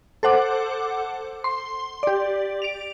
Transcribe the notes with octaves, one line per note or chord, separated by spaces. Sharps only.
A4 C5 F#5 D6
C6
G4 D5
D7 F7